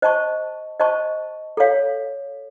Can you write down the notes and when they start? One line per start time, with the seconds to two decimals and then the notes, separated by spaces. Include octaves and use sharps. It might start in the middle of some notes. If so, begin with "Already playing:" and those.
0.02 C5 D#5 A5 C#6
0.80 C5 D#5 A5 C#6
1.57 A4 C#5 F5